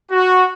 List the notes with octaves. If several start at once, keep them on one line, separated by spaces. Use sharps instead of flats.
F#4